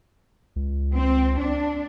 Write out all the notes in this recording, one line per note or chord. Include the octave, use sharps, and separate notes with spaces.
C#2
C4
D4